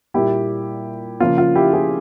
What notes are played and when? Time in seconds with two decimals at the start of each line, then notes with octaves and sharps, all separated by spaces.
0.14 A#2 G3 A#3 E4 G4
1.20 C#3 F3 A#3 F4
1.38 F4
1.56 E4 G4
1.73 F4 G#4